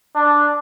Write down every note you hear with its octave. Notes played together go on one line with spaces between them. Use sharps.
D4